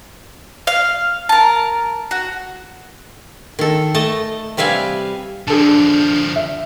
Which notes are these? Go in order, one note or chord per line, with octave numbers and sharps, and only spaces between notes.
F5
A#4 A5
F#4
D#3 A4
A3 D#5 A5
C3 G3 B4 E5 F5 G#5
D3 F3 D4 G#4 A4 A5
E5